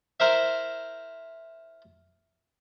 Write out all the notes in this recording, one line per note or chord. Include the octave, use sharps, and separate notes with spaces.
E4 A#4 C5 E5